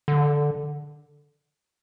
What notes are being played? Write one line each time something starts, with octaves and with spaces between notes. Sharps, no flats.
D3